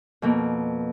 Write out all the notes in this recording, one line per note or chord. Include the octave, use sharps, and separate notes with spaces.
F2 B2 A#3